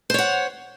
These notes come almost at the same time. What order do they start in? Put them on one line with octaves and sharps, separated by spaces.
C5 C#5 F#5